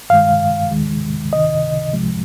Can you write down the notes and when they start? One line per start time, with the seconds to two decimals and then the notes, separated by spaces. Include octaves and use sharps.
0.10 G2 D#3 G#3 F5
0.71 D#2 D#3 G#3
1.32 C#2 C3 D#3 D#5
1.93 C2 C3 F3 G#3